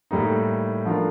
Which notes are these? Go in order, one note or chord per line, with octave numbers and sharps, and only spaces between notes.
A2 G3 A#3 D#4
F3 A3 D4 F4 A#4